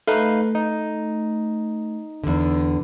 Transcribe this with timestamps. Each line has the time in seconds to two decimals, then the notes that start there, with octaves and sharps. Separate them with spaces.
0.07 A3 D#4 B4 F5
0.55 D#4
2.24 E2 D3